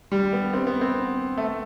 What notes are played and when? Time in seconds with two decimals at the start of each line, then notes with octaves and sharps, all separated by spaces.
0.12 G3
0.33 B3
0.54 C4
0.67 B3
0.81 C4
1.37 A3